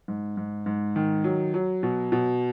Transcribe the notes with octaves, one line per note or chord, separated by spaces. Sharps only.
G#2
G#2
G#2
D#3
F#3
F#3
B2
B2